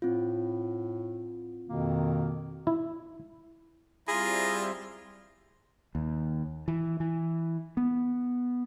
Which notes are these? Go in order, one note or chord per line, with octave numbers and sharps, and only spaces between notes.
A2 C4 F4
F2 B2 D#3 A#3
E4
G3 C4 E4 F4 G#4 A#5
D#2
E3
E3
B3